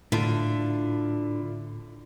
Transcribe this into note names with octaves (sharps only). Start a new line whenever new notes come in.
A2 D3 E4 F4 A5